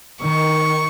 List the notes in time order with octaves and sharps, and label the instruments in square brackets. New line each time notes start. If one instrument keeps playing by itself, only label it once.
[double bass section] D#3 [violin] C#6